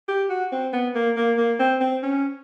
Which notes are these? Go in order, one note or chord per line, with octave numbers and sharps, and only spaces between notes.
G4
F#4
C4
B3
A#3
A#3
A#3
C4
C4
C#4